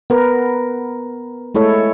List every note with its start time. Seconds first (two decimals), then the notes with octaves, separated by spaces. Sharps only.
0.10 B3 A#4 B4
1.55 G#3 A3 E4 A4 C#5